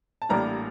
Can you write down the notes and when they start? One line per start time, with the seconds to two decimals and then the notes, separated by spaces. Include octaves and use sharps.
0.22 A5
0.29 A1 A2 G3 A#3 D4 A#5